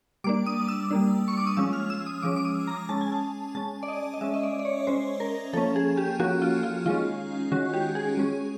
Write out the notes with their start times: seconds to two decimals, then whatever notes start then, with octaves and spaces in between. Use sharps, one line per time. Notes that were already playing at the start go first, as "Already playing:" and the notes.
0.24 G3 A#3 D4 D6
0.46 D#6
0.68 E6
0.91 G3 A#3 D4
1.28 C#6
1.37 D6
1.47 D#6
1.57 F3 G#3 C#4 E6
1.73 F6
1.90 E6
2.06 D#6
2.22 F3 G#3 C#4 D6
2.36 D6
2.45 D#6
2.67 A#5
2.89 G#3 C#4 A5
3.01 G#5
3.12 A5
3.55 G#3 C#4 A5
3.83 D5
3.88 D#5
4.14 D#5
4.21 G#3 C#4 E5
4.34 D#5
4.43 D5
4.59 D5
4.65 C#5
4.87 G#3 C#4 C5
5.20 A#4
5.53 F3 A#3 C#4 A4
5.76 G#4
5.97 G4
6.19 F3 A#3 C#4 F#4
6.42 F4
6.63 F4
6.85 D#3 G#3 C#4 F4
7.51 D#3 G#3 C#4 F#4
7.74 G4
7.95 G#4
8.17 G#3 C#4